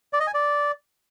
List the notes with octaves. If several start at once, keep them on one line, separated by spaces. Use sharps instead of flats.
D5
D#5
G#5
D5